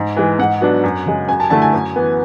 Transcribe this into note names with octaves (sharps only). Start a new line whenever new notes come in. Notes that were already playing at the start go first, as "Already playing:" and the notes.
Already playing: G#2
E3 G#3
G#2 F#5
F#3 B3 D4
F#2
C#3 G#3
F#2 G#5
A5
D3 A3 E4 A5
G#5
F#2
E3 B3